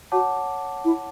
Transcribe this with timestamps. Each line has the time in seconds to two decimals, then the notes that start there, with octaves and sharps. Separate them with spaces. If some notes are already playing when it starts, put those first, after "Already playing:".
0.12 F#4 C#5 F#5 A5 D6
0.85 E4